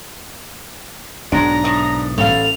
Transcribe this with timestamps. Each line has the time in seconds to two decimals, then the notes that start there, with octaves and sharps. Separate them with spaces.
1.32 B1 G#2 B2 G#3 D4 A#5
1.64 A2 D#5
2.18 A1 A4 F5 F7